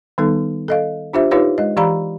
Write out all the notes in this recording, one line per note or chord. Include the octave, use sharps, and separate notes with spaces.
D#3 G3 B3 D#4 A4
A4 D#5 F5
D4 F4 G4 C5 E5
D#4 F4 G4 B4 C#5 F5
G#3 D#5
E3 G4 D5 F5 A#5 B5